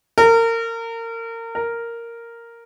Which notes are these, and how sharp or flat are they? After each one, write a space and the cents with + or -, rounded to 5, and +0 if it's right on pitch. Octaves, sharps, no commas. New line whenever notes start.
A#4 -30
A#4 -5